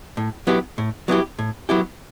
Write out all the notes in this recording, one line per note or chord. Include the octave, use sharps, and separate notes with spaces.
A2
F#3 B3 E4 G4
A2
F#3 B3 E4 G4
A2
F#3 B3 E4 G4